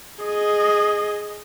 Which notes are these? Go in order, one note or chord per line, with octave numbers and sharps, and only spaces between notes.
G#4 D#5